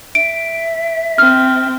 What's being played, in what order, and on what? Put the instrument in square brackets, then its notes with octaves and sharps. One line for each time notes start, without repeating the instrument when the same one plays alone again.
[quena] E5 [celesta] D7
[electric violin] C4 [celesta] F6